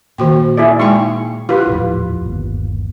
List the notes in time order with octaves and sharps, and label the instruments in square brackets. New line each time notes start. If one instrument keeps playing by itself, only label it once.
[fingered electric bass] A#2 [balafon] D#3 F#4 G5
[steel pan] E4 G#4 D5
[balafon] G#3 D#4 G5 [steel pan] C#6
[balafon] E4 G4 [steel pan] F4 B4
[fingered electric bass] D#1 A1 F2
G1 D#2